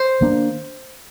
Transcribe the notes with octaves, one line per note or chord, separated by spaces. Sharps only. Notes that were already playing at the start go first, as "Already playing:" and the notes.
Already playing: C5
D#3 A#3 D4